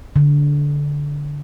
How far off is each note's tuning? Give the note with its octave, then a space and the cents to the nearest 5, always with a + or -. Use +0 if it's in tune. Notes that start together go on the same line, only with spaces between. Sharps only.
D3 -15